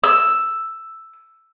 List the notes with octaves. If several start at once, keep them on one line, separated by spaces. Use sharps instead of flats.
E6